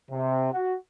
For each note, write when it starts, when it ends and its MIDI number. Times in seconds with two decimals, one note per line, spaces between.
0.11 0.48 48
0.53 0.75 66